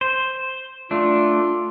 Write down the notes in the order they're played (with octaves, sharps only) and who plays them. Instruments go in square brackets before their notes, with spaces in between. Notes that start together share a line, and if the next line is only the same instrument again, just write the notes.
[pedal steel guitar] C5
[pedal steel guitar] A3 D4 [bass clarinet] F4